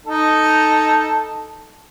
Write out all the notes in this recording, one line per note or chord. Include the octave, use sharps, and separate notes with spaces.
D#4 A4